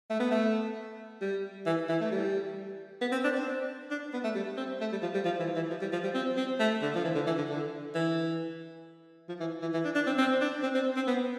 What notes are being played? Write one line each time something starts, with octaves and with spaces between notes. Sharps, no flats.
A3
B3
A3
G3
E3
E3
A3
G3
B3
C4
D4
C4
D4
B3
A3
G3
C4
A3
G3
F3
G3
F3
E3
E3
F3
G3
F3
G3
C4
C4
A3
D3
F3
E3
D3
E3
D3
D3
E3
F3
E3
E3
E3
D4
D4
C4
C4
D4
C4
C4
C4
B3